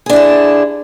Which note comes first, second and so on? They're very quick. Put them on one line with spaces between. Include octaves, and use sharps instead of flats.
G#4 D4 E4 D3